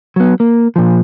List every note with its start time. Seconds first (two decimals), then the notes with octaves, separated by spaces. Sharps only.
0.16 F#3 B3
0.40 A#3
0.76 A#2 F3